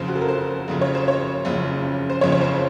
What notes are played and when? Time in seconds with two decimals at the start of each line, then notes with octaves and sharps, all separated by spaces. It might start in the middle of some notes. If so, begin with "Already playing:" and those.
Already playing: F#1 F2 C#3 C5
0.08 F#4
0.15 A4
0.21 A#4
0.28 C5
0.68 F#1 F2 C#3
0.81 C#5
0.95 C5
1.08 C#5
1.45 F#1 F2 C#3
2.10 C5
2.21 F#1 F2 C#3 C#5
2.32 C#5
2.41 C5